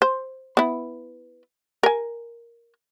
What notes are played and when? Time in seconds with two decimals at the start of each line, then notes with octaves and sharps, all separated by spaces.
0.02 C5
0.57 B3 E4
1.83 A#4 G#5